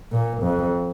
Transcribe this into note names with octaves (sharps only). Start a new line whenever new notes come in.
A#2
F2